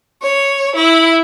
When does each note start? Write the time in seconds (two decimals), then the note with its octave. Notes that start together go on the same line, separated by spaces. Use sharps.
0.22 C#5
0.75 E4